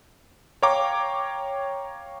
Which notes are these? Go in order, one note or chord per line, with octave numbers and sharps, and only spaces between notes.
C#5 F5 G5 A#5 D6